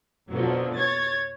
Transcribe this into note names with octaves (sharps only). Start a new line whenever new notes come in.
F2 B2 D3 F3 F#3
C#5 G#6 A6